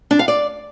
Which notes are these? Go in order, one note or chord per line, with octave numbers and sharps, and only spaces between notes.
D4
F5
D5